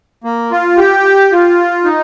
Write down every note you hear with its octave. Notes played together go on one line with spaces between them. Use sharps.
A#3
F4
G4
F4
D#4